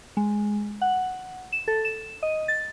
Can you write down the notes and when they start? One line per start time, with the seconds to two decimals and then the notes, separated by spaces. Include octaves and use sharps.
0.17 G#3
0.82 F#5
1.53 E7
1.68 A4
1.85 E7
2.23 D#5
2.48 A6